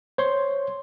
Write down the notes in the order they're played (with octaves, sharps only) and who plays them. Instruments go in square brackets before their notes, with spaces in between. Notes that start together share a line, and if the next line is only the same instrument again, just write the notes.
[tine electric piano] C5 C#5 C6